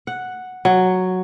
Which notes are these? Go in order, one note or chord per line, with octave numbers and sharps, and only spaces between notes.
F#5
F#3